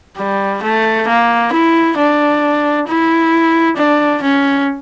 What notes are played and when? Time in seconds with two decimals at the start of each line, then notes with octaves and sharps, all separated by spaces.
0.18 G3
0.63 A3
1.08 A#3
1.53 E4
1.98 D4
2.88 E4
3.77 D4
4.22 C#4